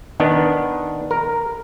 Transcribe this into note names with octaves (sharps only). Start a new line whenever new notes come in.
D#3 B3 D4
A#4